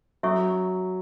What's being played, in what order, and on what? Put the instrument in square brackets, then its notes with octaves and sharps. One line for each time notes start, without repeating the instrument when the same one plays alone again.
[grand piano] F#3 [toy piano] C#4 A4 E5 C#6